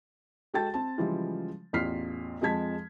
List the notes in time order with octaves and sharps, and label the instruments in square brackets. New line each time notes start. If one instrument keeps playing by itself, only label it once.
[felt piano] G#3 F#4 A4 G5 A5 A6
C4 A5
C#3 E3 F3 G3 G#3 F4
A1 E2 F4 F6 B6 C7
F2 F3 G#3 A5 G#6 B6